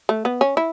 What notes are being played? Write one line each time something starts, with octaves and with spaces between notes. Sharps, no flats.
A3
B3
C#4
E4